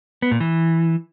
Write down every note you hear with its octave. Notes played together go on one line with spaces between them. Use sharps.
B3
A#2
E3